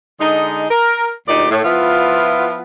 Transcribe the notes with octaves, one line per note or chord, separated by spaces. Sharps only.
D3 G#3 D#4
A#4
D2 A#2 D#4 G4 D5
A2
F3 B3 E4 F4